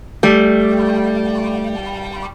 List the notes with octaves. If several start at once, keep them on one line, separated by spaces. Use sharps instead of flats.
G3 A3